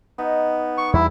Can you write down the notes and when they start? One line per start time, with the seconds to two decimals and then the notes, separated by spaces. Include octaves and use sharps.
0.18 B3 D#4
0.78 C#6
0.93 E2 G3 E4